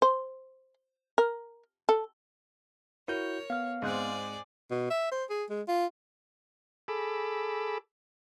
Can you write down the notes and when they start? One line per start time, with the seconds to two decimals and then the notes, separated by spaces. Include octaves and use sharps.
0.02 C5
1.18 A#4
1.89 A4
3.08 E4 F#4 A#4 C#5 G6
3.50 B3 F5 F6
3.82 G#2 C4 G#4 D5 F#6
4.71 B2
4.90 E5
5.12 C5
5.30 G#4
5.50 G#3
5.68 F4
6.88 G#4 A4 B5 D6 E6